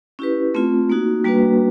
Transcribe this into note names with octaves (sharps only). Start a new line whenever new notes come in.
C#4 E4 G4 B4
A3 C4 F4
A#3 D#4 F#4
G3 A#3 D4 F#4 B4